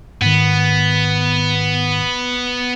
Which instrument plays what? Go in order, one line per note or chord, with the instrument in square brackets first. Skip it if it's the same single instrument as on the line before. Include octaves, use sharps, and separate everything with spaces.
[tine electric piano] G#2 D#3 [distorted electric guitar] B3